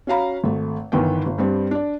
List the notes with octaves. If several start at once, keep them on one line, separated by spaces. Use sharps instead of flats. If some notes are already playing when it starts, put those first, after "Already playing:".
C#4 F#4 F5 A#5 B5
G#1 A3
G1 D#3 E3 B3 G5
G1
G2 G3 C4
D4 D5